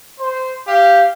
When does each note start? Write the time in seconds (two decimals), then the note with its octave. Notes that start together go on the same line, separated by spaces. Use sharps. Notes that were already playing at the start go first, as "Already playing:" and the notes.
0.20 C5
0.68 G4 F5